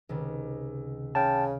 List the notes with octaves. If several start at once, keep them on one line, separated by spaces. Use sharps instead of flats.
C#2 C3 D#3
C#3 G5 A5 F6 G6